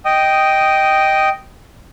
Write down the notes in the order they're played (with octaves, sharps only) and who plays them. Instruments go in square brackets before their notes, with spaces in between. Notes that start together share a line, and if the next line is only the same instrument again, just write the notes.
[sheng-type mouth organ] D#5 G5 D#6